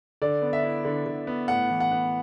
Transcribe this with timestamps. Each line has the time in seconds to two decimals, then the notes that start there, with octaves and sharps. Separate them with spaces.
0.22 D3 D5
0.42 B3
0.53 E5
0.63 E4
0.85 D3
1.06 D3
1.27 B3
1.48 A2 F#5
1.70 E3
1.80 F#5
1.92 B3